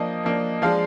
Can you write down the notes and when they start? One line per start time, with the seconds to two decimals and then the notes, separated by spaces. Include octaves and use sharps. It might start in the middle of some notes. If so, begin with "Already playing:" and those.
Already playing: F3 A#3 D4 D#5
0.24 F3 A#3 D4
0.62 F3 G#3 D4 F5